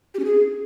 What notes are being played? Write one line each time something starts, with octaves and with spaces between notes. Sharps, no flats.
G4
C#4
G#4